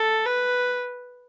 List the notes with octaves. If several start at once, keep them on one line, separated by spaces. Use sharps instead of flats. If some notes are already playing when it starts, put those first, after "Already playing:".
Already playing: A4
B4